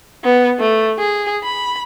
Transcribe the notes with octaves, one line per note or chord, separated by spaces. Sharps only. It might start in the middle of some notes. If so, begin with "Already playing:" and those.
B3
A3
G#4
B5